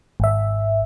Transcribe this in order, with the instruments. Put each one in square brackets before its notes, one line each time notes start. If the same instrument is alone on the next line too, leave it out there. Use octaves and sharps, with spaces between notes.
[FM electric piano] G#1 E5